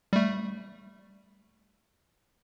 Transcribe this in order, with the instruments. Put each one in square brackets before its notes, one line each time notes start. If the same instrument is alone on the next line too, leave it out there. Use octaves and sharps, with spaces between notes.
[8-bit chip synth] G3 A3